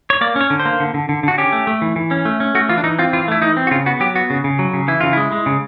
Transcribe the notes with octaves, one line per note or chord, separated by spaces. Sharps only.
C#5
A#3 D5
C#4 C#5
D3
C5
A#3
D3
D3
D3
D3 F#4
C#4 G4
A3
A3
E3
E3
C#4
A3
C#4
A3 F#4
E3 F4
D4
E3 D#4
C4 F4
E3 F4
A3 E4
E3 D#4
C4
F#4
C#3 F4
B3 F#4
F#3 G4
B3 F#4
C#3
C#3
F#3
C#3
E3 E4
C#3 F4
G#3 E4
G#3
C#3